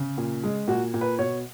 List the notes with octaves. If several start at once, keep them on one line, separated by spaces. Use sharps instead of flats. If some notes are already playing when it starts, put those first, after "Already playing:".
Already playing: C#3
A#2
G#3
A#2 F#4
A#2
B4
B2 C#5